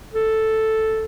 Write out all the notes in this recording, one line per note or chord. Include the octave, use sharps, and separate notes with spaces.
A4